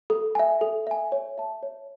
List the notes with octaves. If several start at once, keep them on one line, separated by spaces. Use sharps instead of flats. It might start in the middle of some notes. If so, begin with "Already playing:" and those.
A4
E5 G#5
A4
E5 G#5
C#5
E5 A5
C#5